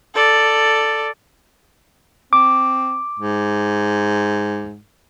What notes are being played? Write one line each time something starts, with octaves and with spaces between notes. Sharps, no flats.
A4 D5
C4 D6
G#2